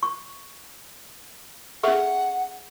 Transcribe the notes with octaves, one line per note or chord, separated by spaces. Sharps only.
C#6
C#4 G#4 A4 E5 F#5 C#6